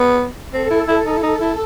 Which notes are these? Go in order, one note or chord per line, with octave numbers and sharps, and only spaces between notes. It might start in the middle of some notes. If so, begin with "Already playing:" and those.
Already playing: B3
C4 A4
E4
E4
D#4
E4
D#4 A4
E4